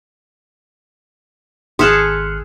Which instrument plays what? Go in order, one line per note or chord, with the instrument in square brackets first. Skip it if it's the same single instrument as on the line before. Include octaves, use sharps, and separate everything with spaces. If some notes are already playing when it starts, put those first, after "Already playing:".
[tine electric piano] G#1 F6 F#6 [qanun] G#4 A4 [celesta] C6 B6 C#7